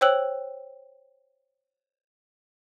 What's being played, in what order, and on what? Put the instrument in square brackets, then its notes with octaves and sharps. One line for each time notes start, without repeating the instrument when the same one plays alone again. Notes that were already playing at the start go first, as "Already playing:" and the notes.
[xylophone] C5 C#5 G5 E6 F#6 F#7